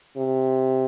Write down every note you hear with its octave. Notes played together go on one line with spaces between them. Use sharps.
C3